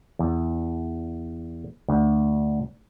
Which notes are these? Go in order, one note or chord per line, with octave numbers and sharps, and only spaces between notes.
E2
D2